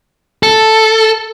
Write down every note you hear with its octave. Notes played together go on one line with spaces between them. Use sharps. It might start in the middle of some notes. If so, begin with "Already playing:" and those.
A4